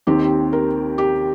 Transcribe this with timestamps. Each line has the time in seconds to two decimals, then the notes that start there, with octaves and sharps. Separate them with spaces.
0.07 D#2 D#3 C4 G4
0.53 A#4
0.98 G4